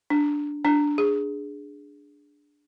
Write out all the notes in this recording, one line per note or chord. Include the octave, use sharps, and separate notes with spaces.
D4
D4
G#4